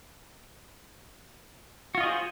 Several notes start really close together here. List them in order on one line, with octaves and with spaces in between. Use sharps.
F#4 F4 D#5 G#4 C5